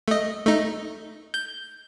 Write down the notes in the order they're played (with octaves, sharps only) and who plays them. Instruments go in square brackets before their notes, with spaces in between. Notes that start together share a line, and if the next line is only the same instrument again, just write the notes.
[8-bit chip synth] A3 D#5
A3 D#4
G6